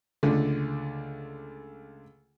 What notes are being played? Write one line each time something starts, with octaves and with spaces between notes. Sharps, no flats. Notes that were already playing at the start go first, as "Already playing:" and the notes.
C#2 D3 A3